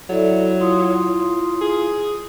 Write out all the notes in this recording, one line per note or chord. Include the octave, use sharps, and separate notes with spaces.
F#3 E4 A4 D5 E5
E4 F4 C6 D#6
F4
G#4